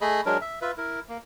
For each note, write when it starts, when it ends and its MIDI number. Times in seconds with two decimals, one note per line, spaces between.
0.01 0.21 57
0.01 0.21 68
0.01 0.21 75
0.01 0.21 83
0.26 0.38 54
0.26 0.38 56
0.26 0.38 62
0.26 0.38 70
0.41 0.59 76
0.61 0.72 65
0.61 0.72 71
0.61 0.72 76
0.78 1.00 64
0.78 1.00 70
1.09 1.18 58